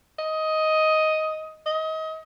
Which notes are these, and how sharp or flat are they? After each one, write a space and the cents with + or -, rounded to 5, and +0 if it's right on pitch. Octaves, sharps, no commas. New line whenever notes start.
D#5 +10
D#5 +30